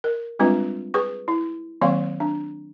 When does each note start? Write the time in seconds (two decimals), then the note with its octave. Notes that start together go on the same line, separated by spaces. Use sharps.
0.04 A#4
0.39 G3 G#3 C4 D4 F4 B4
0.94 G#4 B4 C#6
1.28 E4
1.81 D#3 F#3 A#3 C4 F5 C6
2.20 D4